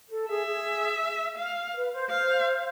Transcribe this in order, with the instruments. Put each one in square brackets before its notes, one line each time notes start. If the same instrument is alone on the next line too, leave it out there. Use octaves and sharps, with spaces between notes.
[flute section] A4
[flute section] G#4 [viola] E5
[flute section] G#4
[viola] F5
[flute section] B4
C5
[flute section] C5 [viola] F5